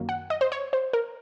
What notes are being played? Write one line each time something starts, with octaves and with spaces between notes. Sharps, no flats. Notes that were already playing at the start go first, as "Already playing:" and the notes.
Already playing: F#2 D#3 F#3 A#3
F#5
D#5
C5
C#5
C5
A#4